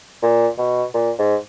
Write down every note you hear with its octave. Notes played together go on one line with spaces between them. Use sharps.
A#2
B2
A#2
G#2